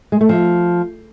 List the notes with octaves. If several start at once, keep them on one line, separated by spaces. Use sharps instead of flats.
G#3
A3
F3